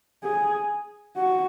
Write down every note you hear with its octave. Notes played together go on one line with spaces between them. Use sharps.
G#4
F#4